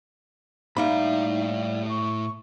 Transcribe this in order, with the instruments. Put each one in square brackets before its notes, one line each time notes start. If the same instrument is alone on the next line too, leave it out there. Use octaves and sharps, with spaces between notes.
[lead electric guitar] A2 E5 [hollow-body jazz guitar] G3 A#3 B5 [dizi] D#4
[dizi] C#6